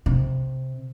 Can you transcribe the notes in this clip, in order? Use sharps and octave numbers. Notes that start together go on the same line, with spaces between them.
C3